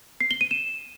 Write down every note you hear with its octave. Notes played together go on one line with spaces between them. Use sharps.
C7
G7
D#7
E7